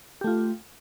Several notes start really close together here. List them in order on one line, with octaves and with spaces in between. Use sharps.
G4 A3 F4